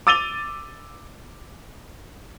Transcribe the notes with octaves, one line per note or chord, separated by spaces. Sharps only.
D6 E6 A6 D#7 F7 G7